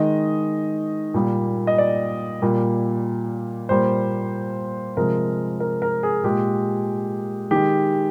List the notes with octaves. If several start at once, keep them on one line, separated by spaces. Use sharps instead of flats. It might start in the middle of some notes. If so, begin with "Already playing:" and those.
Already playing: D#3 G#3 D#5
A#2 G3 A#3
D#5
D5
A#2 G3 A#3
A#2 G3 A#3 C5
C3 F3 G#3 A#4
A#4
A#4
G#4
A#2 G#3 G4
D#3 G#3 G4